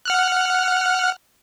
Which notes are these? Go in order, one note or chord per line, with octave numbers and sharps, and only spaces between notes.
F#5 F6 F#6